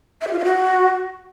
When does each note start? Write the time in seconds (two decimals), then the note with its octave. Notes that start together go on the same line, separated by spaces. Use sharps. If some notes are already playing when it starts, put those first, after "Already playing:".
0.21 E5
0.27 G4
0.32 F4
0.38 F5
0.44 F#4